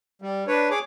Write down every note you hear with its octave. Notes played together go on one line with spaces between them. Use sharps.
G3
D4 B4 C#5
G#4 C#5 D6